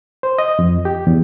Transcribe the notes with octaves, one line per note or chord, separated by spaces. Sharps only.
C5
D#5
F2
G4
E2